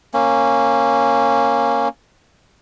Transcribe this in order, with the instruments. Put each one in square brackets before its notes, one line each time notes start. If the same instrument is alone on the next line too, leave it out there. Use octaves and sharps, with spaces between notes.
[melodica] A#3 C#4